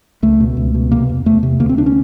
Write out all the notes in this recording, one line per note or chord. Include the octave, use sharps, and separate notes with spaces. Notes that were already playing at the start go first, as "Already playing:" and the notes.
C#2 A3
B2
C#2
B2
C3 A#3
E2
E2 A3
C3
D2 A#3
C4
D2 D4
C#4